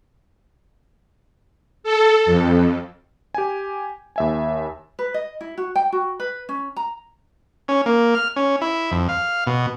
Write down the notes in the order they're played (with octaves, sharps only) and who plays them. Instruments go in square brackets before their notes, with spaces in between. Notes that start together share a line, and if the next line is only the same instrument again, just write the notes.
[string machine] A4
F2
[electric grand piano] G4 G#5
D#2 E5 G#5
[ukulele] B4
D#5
E4
F#4
G5
F#4
B4
C#4
A#5
[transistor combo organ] C#4
A#3
F6
C#4
E4
F2
F5
B2